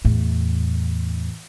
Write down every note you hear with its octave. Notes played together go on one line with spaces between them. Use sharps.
E2 A2